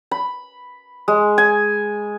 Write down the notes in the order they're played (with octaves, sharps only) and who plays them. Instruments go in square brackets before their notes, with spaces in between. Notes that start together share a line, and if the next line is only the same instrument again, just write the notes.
[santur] B5
G#3
G#5